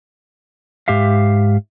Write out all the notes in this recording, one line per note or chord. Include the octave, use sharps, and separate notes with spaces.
G#2 G4 E5 F5